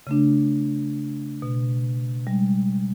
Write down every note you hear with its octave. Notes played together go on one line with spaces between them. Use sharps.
C#3 A3 D4
B2
G3 G#3